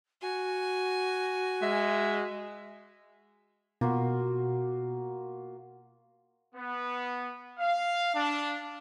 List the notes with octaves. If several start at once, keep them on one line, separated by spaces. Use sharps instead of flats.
F#4 G#5
G#3 E5
B2 A#3 F4 F#4
B3
F5
D4